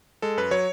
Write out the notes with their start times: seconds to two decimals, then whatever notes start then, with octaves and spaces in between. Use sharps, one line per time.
0.22 G#3 A4
0.37 F#2 B4
0.51 F#3 C#5